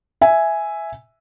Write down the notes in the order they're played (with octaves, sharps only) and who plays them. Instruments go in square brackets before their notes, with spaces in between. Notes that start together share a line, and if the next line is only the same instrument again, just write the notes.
[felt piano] E5 G#5